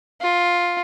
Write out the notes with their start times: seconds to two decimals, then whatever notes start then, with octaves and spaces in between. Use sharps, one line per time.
0.22 F4